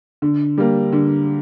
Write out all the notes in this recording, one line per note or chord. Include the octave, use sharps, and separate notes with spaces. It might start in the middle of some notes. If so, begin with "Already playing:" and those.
D3
G3 A#3
D3